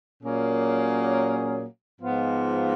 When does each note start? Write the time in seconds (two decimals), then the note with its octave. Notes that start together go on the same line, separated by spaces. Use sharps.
0.23 A#2 F#3 A#3 C#4 G#4
2.00 G#2 F3 G#3 B3 F4